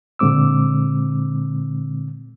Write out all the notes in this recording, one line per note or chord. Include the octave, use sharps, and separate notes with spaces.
A#2 D3 G#3 C4 D6 E6